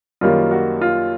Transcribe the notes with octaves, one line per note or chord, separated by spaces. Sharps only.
F#2 D#3 G3 A#3 F4
F#4
F4